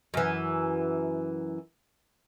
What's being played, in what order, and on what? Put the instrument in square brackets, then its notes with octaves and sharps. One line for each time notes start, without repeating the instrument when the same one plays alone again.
[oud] F#2 E3